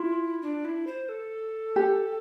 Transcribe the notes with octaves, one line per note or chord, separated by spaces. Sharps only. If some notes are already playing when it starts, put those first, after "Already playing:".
Already playing: E4 F4
D4
E4
C5
A4
G4